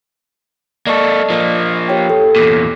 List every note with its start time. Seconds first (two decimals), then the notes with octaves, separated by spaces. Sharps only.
0.87 A#3 A4 D5 D#5 C#6
1.30 F3 A#3
1.88 G4 C#5 G5
2.10 A4
2.36 E2 A#2 D6